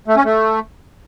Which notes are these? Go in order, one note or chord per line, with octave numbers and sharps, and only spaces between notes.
A3
C#4
A3